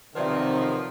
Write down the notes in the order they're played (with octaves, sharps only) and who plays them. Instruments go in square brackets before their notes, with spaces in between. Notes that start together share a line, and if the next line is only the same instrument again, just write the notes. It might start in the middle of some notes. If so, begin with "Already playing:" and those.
[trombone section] B1 D#3 [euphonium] C3 [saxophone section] F3 [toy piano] B4 D5 E5